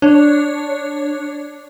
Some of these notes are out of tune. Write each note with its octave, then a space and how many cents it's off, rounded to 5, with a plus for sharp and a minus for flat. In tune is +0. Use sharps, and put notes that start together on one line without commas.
D4 +0 C#5 +0